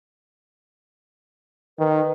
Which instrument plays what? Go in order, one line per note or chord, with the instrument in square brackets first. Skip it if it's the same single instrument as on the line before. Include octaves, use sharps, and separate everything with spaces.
[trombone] D#3 [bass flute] B4